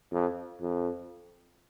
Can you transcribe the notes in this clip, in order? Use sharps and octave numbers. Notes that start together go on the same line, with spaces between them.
F2
F2